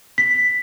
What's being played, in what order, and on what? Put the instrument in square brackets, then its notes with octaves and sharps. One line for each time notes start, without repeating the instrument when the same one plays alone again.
[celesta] B6